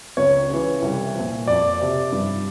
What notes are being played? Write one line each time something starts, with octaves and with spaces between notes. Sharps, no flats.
C#2 C#5
C#3 E3
C2
F3
A#2
F2 D5
C3 F3
G2